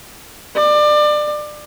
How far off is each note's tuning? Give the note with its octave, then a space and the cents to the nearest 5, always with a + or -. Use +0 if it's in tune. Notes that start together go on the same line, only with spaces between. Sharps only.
D5 +25